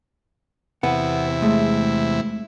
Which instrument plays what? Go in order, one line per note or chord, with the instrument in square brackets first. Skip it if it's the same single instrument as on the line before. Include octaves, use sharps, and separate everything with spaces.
[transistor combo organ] E2 C3 E4 [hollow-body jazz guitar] B3 F#5
[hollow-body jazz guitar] G#3 A3